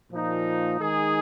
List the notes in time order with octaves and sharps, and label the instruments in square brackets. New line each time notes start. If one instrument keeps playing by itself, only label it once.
[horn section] A#2 F3 A#3 D#4
D#3 G#3 D#4 G#4